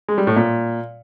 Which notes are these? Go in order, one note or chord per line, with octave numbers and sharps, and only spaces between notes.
G#3
G3
A2
A#2